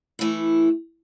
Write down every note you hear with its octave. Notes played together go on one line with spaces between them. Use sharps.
E3 A3 E4